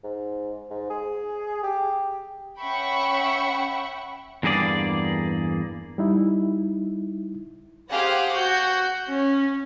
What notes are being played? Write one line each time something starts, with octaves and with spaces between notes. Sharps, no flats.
G#2
G#2
G#4
G4
C#4 E5 F#5 G5 B5 C#6
E2 G2 A#3 G#4 D5
G3 D#4 E4
G4 G#4 C5 F5 F#5
F#4 G6
C#4